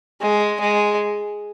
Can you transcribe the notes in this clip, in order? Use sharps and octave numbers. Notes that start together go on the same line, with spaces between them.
G#3
G#3